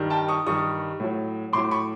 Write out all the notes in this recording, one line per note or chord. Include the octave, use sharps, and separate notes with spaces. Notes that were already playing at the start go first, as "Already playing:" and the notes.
Already playing: G2 D#3 G3
G5 A5
C#6 D#6
G2 D#3 G3 C#6 D#6
A2 F#3
A2 F#3 C6 D6
B5 C#6